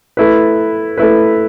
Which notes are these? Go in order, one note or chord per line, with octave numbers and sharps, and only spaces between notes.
A3 E4 B4
A3 E4 B4